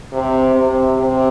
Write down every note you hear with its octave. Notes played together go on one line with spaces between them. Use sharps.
C3
C3
C3